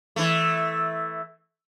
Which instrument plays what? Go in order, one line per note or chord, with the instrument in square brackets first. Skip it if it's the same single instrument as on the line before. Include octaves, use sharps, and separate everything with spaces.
[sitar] E3 A3